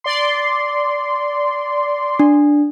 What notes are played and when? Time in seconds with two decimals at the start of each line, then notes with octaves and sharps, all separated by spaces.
0.04 D5 C6
2.20 D4